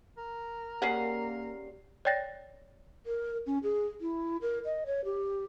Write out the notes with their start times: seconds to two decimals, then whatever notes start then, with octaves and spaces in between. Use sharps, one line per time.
0.18 A#4
0.82 C#3 A#3 C#4 G4 D5 F#5 C7
2.05 C#5 D5 G5 A6 A#6
3.04 A#4
3.46 C#4
3.63 G#4
4.01 E4
4.41 A#4
4.65 D#5
4.86 C#5
5.05 G4